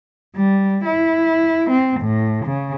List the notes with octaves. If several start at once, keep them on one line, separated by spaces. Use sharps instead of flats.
G3
E4
C4
A2
C#3